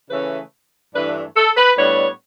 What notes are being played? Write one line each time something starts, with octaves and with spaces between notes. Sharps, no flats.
C#3 E3 A3 C#4 B4
G2 E3 A3 D4 B4
A4
B4
A2 G3 B3 D4 C#5